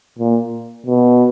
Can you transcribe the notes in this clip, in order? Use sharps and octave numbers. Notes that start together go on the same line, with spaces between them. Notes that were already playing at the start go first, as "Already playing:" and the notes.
A#2
B2